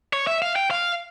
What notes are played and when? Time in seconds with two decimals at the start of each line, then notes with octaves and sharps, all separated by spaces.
0.13 C#5
0.27 E5
0.42 F5
0.56 G5
0.71 F5